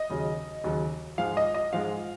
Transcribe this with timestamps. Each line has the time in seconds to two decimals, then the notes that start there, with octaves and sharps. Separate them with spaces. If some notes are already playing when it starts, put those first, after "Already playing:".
Already playing: D#5
0.10 D#2 C#3 F#3
0.64 D#2 C#3 F#3
1.18 G#2 F3 G#3 F5
1.37 D#5
1.54 D#5
1.73 G#2 F3 G#3 F5